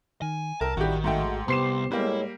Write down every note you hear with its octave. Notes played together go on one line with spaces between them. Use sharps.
D#3 G#5
C2 A#4 E5 G5 A5
A1 D#3 G3 E4 F#4 G4 G5
G#2 G#3 A3 F#4 G5
C2 B3 G4 C5 C6 C7 E7
A2 G3 G#3 A#3 E4